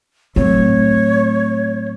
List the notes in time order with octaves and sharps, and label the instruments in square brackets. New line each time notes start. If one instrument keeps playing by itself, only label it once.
[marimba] A2 F#3 C4 [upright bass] A3 [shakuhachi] C#5